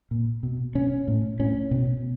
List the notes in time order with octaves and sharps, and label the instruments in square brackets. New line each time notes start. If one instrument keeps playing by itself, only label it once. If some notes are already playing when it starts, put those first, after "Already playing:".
[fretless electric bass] A#2
B2
B2 C#4
A2
A2 C#4
B2